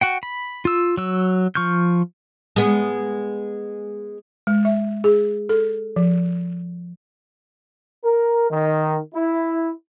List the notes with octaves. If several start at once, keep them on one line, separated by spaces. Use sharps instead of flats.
F#4 F#5 G5
B5
F4 E6
F#3 E6
F3 C#6 F6 G6
G#3 B3
G#3
E5
G#4
A4
F3
A#4
D#3
E4